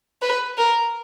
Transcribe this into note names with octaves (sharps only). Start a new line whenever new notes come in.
B4
A#4